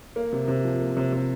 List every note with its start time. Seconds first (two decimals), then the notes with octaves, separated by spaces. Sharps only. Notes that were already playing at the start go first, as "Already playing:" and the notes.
0.16 A#3
0.33 C3
0.48 C3
0.64 F3
0.80 A#3
0.97 C3
1.13 C3